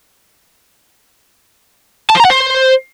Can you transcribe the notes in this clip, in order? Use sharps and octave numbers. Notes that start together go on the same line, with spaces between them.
A5
C5
A#5
F#5
C5